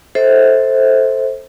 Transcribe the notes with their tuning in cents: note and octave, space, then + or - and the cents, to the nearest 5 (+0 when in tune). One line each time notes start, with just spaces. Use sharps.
A4 +0 C5 +10 E5 -35